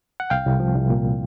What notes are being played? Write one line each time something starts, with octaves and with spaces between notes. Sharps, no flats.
F#5
C2 F5 G5
C2
F3
C2
A#2